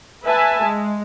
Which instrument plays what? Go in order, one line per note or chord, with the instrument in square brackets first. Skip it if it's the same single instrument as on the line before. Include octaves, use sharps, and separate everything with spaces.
[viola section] B4 E5 G#5 A5
G#3